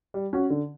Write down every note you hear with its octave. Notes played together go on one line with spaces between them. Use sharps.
G3
C#4 F#4
D3